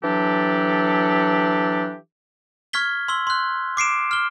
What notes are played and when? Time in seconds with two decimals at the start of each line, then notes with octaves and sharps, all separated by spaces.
0.03 E3 F#3 D4 G4 A4
2.73 C#6 F6 G#6 B6 G7
3.08 C6 E6 G7
3.27 C6 F#6
3.77 D6 C7 D7 E7
4.11 F6 G7